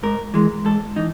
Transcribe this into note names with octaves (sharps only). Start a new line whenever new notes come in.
G#2 A#4
E3 G#3
G#2 A4
E3 D#4